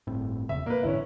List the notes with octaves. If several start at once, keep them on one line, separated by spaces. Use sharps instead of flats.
G1 A2 C4
E1 C#3 E5
A#2 A#3 B4
A1 G#2 D3 C#4 E4